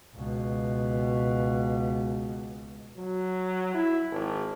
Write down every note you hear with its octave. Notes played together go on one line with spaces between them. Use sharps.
C#2 B2
F#3
E4
G#1